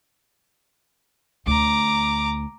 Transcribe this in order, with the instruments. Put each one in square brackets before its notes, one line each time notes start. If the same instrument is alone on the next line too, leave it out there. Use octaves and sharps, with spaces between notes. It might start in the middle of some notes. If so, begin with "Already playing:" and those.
[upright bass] D2 [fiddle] A#5 D6